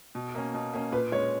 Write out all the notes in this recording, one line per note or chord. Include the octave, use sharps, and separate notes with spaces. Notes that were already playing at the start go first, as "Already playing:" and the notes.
B2
A#3 C#4
B2
A#3 C#4
A#2 B4
G#3 C#4 C#5